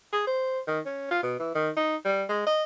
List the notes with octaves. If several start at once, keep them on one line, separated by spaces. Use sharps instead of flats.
G#4
C5
D#3
C#4
F4
B2
E3
D#3
D#4
G3
G#3
D#5